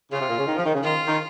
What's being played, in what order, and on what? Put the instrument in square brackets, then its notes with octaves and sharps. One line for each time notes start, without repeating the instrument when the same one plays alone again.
[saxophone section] C#3 [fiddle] F4
[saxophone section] C3
A#2
C#3
D#3
F3
D#3
C#3
[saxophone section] D#3 [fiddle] F4
[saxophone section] D#3